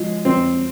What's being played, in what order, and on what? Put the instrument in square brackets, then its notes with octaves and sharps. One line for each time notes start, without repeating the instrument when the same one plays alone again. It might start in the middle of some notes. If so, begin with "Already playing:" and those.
Already playing: [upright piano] F3 [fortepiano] G#3
[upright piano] F2 [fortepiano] C4